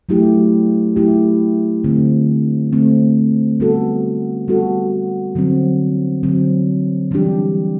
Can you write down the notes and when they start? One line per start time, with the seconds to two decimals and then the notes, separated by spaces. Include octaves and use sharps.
0.09 F#3 A3 E4 G4
0.96 F#3 A3 E4 G4
1.84 D3 A3 C4
2.72 D3 A3 C4
3.60 G3 B3 F#4 A4
4.48 G3 B3 F#4 A4
5.35 D3 F#3 C4
6.23 D3 F#3 C4
7.11 E3 G3 D4 G4